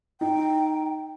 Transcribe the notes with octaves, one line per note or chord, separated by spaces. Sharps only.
D#4 G5